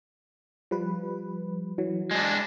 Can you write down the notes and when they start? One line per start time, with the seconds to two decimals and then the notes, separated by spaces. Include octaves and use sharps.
0.71 F3 G3 B4
1.78 E3 F#3
2.11 G#3 D4 G#6